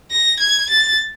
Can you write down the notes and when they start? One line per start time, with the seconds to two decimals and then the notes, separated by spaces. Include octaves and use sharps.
0.11 A#6
0.39 G#6
0.69 A6